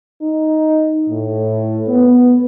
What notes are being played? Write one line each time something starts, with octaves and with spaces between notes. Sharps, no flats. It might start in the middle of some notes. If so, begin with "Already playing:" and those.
D#4
A2
B3